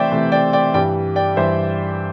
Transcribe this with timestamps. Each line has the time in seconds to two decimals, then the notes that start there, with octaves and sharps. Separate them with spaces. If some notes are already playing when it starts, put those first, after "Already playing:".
Already playing: C3 E3 A3 C5 D5 E5 G5
0.12 C3 E3 A3
0.32 D5 G5
0.53 D5 G5
0.74 G2 E3 G3 D5 G5
1.16 D5 G5
1.36 G2 E3 G3 C5 E5